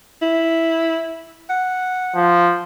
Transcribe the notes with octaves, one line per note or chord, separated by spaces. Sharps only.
E4
F#5
F3